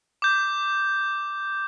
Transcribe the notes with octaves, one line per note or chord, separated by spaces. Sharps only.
D6 G6